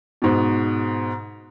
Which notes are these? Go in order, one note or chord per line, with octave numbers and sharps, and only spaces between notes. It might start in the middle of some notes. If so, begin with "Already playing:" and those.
G#2 B2